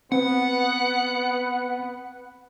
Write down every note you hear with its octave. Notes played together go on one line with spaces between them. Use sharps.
B3 C4 B4 F#5